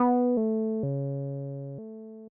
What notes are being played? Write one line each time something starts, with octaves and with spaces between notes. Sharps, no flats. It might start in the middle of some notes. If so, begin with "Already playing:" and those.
Already playing: B3
A3
C#3
A3